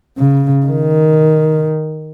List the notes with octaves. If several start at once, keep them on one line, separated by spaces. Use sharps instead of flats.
C#3
D#3